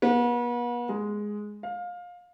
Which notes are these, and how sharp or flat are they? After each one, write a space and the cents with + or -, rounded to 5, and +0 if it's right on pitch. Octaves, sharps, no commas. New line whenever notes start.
B3 -40
G#3 +0
F5 +20